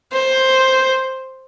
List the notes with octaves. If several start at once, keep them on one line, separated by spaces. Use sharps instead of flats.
C5